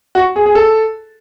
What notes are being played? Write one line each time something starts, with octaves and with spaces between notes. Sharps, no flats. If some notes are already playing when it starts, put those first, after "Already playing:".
F#4
G#4
G#4
A4